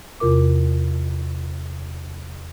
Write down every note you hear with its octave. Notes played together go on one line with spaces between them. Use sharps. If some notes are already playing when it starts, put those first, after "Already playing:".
E2 C3 F4 A#4 D6